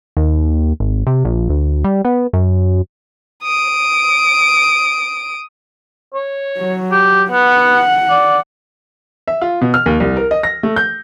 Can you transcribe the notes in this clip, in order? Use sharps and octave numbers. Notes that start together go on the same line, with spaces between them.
D#2
G#1
C3
A#1
D2
G3
B3
F#2
D#6 D7
C#5
F#3
G4
B3 F#5
D5
E5
F4
B2
F6
D#2
C2
A#4
D#5
A#6
A3
G6